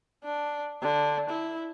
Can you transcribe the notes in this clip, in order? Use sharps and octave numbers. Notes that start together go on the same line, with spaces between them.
D4
D3
E4